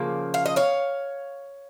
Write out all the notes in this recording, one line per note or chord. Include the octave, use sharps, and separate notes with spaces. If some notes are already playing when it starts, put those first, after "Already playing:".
Already playing: C#3 F3 A#3
F5
D#5
C#5 F5